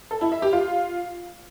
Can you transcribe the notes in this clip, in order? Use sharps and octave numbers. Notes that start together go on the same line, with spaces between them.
A4
E4
E5
G4
F4